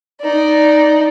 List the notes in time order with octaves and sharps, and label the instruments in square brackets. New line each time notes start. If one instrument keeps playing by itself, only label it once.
[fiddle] D#4 D5